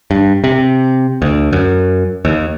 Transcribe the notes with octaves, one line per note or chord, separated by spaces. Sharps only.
G2
C3
D2
F#2
D#2